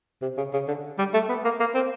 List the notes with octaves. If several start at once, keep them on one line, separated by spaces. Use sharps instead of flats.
C3
C#3
C#3
D3
G3
A3
B3
A#3
A#3
C4